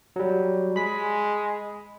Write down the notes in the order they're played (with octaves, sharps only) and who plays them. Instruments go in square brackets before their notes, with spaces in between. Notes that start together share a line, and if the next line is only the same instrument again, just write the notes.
[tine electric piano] F#3 G3
[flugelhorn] G#3 [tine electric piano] B5 B6